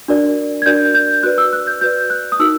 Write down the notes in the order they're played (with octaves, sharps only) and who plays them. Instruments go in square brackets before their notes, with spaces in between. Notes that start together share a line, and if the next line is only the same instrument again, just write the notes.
[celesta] D4 F#4 A#4 D5
G#6
D4 F#4 A#4 D5 G6
G6
F#4 B4 D5 F#6
E6
F#6
G6
F#4 B4 D5 G6
F#6
D#6
D#4 F#4 A#4 E6